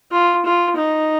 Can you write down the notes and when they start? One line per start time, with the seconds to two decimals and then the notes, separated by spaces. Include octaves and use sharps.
0.11 F4
0.45 F4
0.77 D#4